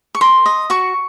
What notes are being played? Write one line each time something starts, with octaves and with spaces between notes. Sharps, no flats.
C#6
A#4 C6
D#5
F#4 C#6